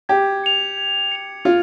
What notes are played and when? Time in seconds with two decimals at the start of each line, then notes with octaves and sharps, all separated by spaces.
0.09 G4 G#6
0.44 C#7 F7
0.77 G#6
1.12 C#7 F7
1.45 F4 G#6